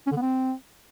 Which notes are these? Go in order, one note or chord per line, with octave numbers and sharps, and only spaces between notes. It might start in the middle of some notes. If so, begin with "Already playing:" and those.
C#4
D3
B3
C4